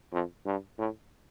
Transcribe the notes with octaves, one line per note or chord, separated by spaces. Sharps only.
F2
G2
A2